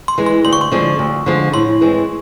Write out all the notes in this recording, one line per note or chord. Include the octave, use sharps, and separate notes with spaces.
C6
E3 G#3
C6
D2 C6
C#6
C6
D3 F3 G#3
D2
D3 F3 G#3
A2 C6
E3 G#3 C4